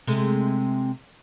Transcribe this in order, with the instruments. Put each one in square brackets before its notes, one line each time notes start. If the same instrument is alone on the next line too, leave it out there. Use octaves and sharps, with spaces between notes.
[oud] C3 G#3 A3